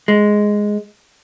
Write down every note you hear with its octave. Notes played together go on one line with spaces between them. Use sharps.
G#3